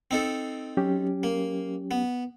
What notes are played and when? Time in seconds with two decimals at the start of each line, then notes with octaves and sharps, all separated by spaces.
0.11 C4 D#4 A4
0.77 F#3 C#4 G4
1.23 A#3
1.91 B3